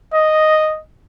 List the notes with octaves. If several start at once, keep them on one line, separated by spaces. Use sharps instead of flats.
D#5